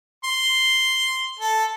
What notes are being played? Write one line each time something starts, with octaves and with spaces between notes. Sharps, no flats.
C6
A4